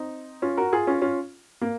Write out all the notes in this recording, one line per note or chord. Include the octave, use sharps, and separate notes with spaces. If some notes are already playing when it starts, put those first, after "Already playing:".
Already playing: C4 D#4
C#4 F4
F#4 A#4
F4 G#4
C#4 F4
C#4 F4
A#3